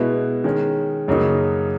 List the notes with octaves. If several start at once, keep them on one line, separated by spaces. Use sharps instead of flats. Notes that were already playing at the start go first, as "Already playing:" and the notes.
Already playing: B2 G#3 B3 E4
D#3 G#3 C#4
F#2 C#3 F#3 A#3 D#4